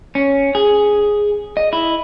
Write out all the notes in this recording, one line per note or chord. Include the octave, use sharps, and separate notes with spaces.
C#4
G#4
D#5
E4